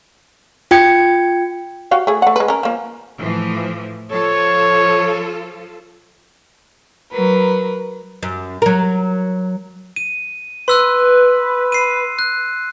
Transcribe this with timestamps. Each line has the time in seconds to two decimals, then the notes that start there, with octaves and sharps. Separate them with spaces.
0.71 F4 G5 G#6 C#7
1.91 F#4 G4 F5
2.07 A3 G#4
2.22 A3 F#5
2.36 G#3 B4
2.48 C#4 A#4
2.63 F3 A#3
3.19 A2 E3 F3
4.11 F3 F4 A4 C#5
7.10 F#3 A#4 B4
8.23 F#2
8.62 F#3 A#4
9.96 D#7
10.68 B4 C6 E6 F#6
11.72 C7 D#7
12.19 F#6